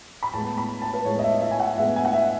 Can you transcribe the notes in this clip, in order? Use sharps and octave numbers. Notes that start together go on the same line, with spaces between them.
B5
A2 G#3 B3 A5
B5
A5
B4
A2 G#3 B3 C#5
D#5
E5
E5
G#5
F#5
A2 G#3 B3 E5
G#5
F#5
E5